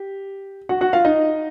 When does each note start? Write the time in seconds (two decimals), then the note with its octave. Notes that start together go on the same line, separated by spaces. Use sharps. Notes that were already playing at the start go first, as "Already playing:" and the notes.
Already playing: G4
0.69 F#4 F#5
0.81 F#4 F#5
0.93 F4 F5
1.05 D#4 D#5